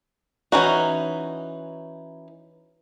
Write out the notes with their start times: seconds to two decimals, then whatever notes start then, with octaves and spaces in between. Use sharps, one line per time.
0.52 E3 C#4 D#4 F#4